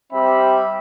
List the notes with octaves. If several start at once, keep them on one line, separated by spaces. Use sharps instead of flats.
G3 C4 G4 E5 B5